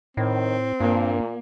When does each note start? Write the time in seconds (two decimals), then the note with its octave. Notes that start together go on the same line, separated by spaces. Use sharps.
0.17 A2 D#3 C4
0.80 G2 A#2 A#3